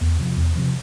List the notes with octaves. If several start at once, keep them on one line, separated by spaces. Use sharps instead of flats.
E2
C3 F3
E2
C3 F3